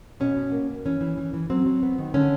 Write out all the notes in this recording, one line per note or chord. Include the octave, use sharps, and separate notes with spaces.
B2 C#4
B2
A#3
B2
E3 C#4
E3
E3
E3
F#3 C4
F#3
B3
D#3
D3 C#4